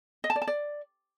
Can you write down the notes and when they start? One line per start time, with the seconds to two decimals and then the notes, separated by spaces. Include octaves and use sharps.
0.24 D#5
0.30 A5
0.36 D5
0.42 A5
0.47 D5